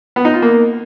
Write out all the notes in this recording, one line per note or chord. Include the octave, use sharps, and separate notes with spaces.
B3
D#4
F4
A#3